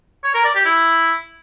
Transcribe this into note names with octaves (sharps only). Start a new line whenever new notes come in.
C#5
A#4
D5
G4
E4